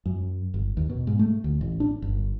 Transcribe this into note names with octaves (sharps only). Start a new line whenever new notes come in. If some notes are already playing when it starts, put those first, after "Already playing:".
F#2
G1
D#2
B2
G#2
A3
D2
A1
D4
G1